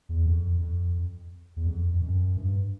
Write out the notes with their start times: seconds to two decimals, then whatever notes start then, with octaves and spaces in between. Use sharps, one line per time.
0.09 E2
0.26 F2
0.61 F2
1.56 E2
1.67 F2
1.95 F2
2.02 F#2
2.37 G2